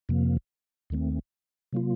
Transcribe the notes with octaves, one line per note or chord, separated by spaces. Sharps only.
F2 C3 F3 A#3
D#2 D#3 A3 C4
C3 F#3 A#3 F4